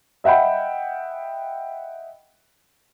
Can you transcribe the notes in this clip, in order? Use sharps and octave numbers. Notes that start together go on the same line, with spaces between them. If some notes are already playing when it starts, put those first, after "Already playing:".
D#5 E5 F#5 G5 B5